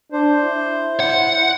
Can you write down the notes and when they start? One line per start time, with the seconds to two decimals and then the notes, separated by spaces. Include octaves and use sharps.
0.12 D4 C5
0.43 E4
1.00 F#5